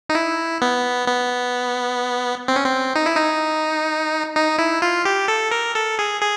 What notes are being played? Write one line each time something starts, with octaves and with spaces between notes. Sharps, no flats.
D#4
E4
B3
B3
C4
C#4
C4
D#4
E4
D#4
D#4
E4
F4
G4
A4
A#4
A4
G#4
G#4